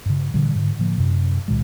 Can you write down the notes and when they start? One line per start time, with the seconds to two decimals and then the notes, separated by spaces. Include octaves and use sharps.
0.06 G2 C#3
0.34 A#2 D3 E3 G3
0.55 G#2 D3
0.79 A2 D3 F3 A#3
0.98 F#2 C3
1.48 C#2 A#2 D#3 G#3